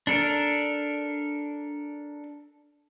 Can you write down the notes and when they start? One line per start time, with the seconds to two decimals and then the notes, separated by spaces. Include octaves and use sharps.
0.07 D4 A4 A#4